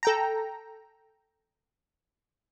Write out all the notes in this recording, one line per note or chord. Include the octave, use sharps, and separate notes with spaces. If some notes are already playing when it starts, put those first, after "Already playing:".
A4 G5 A#5